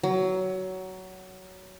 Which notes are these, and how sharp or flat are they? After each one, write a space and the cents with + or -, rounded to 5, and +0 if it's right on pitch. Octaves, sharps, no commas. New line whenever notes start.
F#3 +15